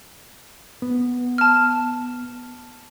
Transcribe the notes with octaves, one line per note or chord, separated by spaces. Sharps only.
B3
A5 F6